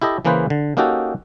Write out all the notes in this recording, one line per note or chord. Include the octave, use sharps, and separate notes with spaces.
E4 G4 A4 D#5
C#3 E3 A#3 G#4 B4 C5
D3
A#3 C#4 D#4 F#4 G4 A4